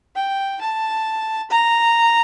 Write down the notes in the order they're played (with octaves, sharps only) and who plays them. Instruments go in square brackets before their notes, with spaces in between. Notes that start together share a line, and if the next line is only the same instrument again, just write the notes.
[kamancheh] G5
A5
A#5